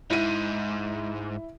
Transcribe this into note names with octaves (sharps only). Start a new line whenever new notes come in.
G#2 E4 D#7